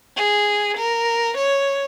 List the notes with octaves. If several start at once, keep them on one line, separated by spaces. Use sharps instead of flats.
G#4
A#4
C#5